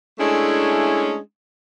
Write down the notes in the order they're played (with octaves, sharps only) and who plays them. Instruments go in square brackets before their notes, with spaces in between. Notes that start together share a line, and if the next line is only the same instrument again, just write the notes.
[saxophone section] G#3 A3 C#4 D4 E4